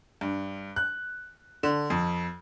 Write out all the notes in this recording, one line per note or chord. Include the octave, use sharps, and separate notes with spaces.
G2
F#6
D3
F2